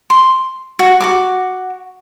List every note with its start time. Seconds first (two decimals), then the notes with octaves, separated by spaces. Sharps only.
0.10 C6
0.79 F#4
1.00 F#4 A#4 D6